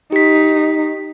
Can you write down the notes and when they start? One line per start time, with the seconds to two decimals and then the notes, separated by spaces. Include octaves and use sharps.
0.12 D#4 G4 B6